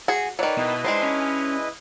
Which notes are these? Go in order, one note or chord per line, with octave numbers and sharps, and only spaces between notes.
F#4 G#4
D#3 F#3 B4 C#5 D5
B2 E4 B4 D#5
G#3 D4 D#4 C5
C#4